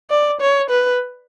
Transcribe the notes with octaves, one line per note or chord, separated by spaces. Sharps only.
D5
C#5
B4